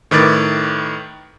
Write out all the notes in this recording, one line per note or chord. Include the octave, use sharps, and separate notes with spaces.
A2 D#3 B4 D6 A6